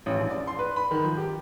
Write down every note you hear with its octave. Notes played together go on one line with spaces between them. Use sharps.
A1
A#1
D5
C6
B4
B5
D#3
F3
G4